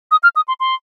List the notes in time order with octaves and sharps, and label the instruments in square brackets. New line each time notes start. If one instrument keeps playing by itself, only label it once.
[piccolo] D#6
F6
D#6
C6
C6